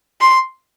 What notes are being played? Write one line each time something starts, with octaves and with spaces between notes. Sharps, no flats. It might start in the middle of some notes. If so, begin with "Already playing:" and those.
C6